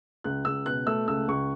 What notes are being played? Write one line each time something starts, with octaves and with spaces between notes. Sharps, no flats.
C#2 F#6
C#2 E6
B2 F#6
A3 E6
C#2 E6
C#2 C#6